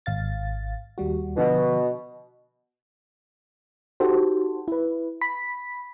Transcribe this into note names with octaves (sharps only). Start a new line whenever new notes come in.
G#1 F5 A6
D#2 G3 F#4
B2 D3 F3
D#4 F#4 G4 A4 C5
E4 B4
B5 B6